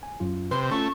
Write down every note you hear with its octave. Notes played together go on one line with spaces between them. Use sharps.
G#5
F#2 F#3 F4
C3 B4 C6
A3 C#4 F4 C#6